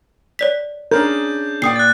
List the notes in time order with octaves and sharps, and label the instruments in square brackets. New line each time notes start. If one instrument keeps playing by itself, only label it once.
[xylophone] C#5 D5 B6
[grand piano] C#4 D4 G#4 [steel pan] A#4 [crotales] G6
[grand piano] A#2 D5 [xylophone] G5 D#6 C7
[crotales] F#6 A6